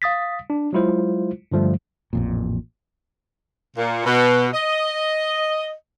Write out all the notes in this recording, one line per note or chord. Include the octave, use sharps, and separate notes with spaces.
F5 D#6 A6 B6
D4
F#3 G#3 E4 F4 C5
G2 D3 F3 G3 A3
A1 F2 A#2
A#2
B2
D#5